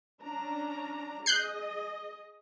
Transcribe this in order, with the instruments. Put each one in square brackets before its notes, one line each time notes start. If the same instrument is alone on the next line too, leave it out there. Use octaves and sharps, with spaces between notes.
[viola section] C#4 D4 A#5
[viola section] G#4 D#5 [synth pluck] F#6 G6 C7